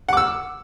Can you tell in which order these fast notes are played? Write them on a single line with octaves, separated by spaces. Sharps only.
F#5 D6 E6